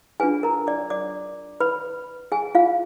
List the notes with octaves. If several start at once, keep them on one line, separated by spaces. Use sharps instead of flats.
D4 F4 G#4 B4 G#5
A#4 A#5
D5 D6
D5 D6
B4 B5
G#4 G#5
F4 F5